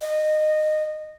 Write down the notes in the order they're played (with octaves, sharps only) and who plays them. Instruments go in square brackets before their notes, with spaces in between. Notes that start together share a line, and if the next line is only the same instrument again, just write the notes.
[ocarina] D#5